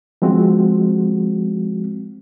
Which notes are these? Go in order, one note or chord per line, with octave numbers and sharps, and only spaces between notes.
F3 G#3 C4 F#4